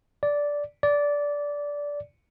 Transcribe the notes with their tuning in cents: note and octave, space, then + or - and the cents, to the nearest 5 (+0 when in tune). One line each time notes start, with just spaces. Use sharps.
D5 -10
D5 -15